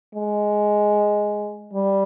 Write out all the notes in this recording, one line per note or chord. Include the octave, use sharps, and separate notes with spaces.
G#3
G3